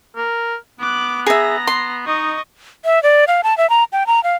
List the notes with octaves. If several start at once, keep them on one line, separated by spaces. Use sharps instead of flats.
A#4
B3 D6 F#6
G#4 E5 A#5 A#6
C6
D#4 D#5 C#6
E5
D5
F5
A5
E5
A#5
G5
A#5
F5